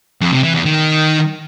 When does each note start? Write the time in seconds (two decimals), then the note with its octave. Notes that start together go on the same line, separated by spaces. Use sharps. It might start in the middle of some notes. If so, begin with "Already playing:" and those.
0.21 F2
0.32 C3
0.43 E3
0.54 E2
0.65 D#3